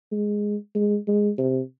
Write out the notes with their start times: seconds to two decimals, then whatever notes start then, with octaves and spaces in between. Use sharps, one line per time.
0.12 G#3
0.75 G#3
1.08 G#3
1.38 C3